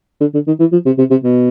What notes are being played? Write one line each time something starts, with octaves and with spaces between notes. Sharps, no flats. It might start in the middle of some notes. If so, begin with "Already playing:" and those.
D3
D3
D#3
E3
F3
C3
C3
C3
B2